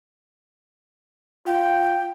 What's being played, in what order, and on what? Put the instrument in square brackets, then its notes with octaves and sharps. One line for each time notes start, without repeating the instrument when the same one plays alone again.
[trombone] F4 [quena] G5